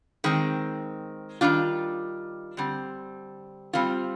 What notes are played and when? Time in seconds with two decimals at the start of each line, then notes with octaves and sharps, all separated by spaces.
0.24 D#3 G#3 C4
1.41 D#3 G3 D4 F4
2.57 D3 G3 C4
3.73 G3 C4 F4